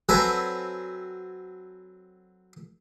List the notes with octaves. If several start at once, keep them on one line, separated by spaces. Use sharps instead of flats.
F#3 C4 A4 B4 G#5 A#5